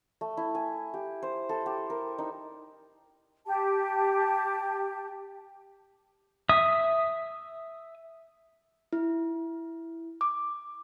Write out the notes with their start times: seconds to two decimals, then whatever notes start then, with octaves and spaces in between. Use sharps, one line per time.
0.21 A3
0.37 E4
0.55 G#5
0.94 G4
1.23 C5
1.49 A4
1.66 G4
1.90 A#4
2.18 D#4
3.46 G4 A5
6.49 E5 D#6
8.93 E4
10.21 D6